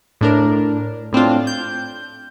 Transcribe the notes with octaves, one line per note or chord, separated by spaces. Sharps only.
A2 D4 A#4
A2 C4 D4 F4
G6